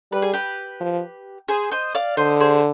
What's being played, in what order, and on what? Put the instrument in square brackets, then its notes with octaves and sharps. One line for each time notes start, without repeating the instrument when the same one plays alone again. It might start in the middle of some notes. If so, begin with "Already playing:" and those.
[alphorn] G3 [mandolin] B4
[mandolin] G#4
G4 B4
[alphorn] F3
[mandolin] G#4 C5
C5 D#5
D5 F5
[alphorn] D3 [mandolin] C5 D#5
[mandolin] G#4 C5